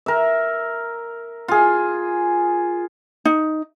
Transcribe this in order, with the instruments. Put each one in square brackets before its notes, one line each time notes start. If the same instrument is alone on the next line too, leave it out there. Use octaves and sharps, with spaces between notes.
[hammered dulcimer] A#4 E5
F4 G#4
[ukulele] D#4